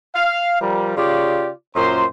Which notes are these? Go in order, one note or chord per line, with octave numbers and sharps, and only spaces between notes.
F5
F3 G3 A#4
C#3 F4 G4 D5
F#2 A#2 C5 A#5 C6